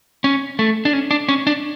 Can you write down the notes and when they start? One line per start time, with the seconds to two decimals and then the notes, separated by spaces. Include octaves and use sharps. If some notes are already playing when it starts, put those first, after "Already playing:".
0.24 C#4
0.59 A3
0.85 D4
0.93 C#4
1.11 D4
1.29 C#4
1.47 D4